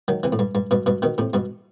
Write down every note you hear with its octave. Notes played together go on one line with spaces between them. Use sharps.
D#3 F#3
C3 E3
A2
G2
G2
G2 B2
G2 B2
B2 D#3
A2 C3
G2 B2